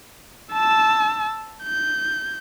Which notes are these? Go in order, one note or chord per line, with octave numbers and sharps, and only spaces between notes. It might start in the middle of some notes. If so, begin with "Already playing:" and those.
A5 E6
G6